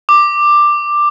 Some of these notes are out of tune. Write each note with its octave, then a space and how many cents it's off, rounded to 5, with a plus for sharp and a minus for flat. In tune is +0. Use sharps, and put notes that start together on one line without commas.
D6 +10